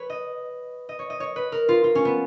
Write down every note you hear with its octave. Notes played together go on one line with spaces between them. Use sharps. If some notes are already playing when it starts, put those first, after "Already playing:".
Already playing: B4 C#5
D#5
D#5
C#5
D#5
C#5
B4
A#4
F4
F4
C#4
B3